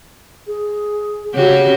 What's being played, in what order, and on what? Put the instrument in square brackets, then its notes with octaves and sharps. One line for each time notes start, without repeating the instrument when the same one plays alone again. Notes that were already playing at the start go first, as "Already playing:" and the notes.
[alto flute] G#4
[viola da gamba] C#3 F#4 G4 [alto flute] C#5